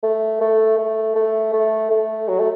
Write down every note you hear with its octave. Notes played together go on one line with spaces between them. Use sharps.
A3
A3
A3
A3
A3
A3
F#3
A3